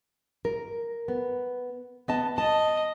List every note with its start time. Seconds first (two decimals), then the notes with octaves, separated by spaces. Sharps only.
0.45 A#4
1.08 B3
2.08 B3 D#5 A5
2.38 D#5 A5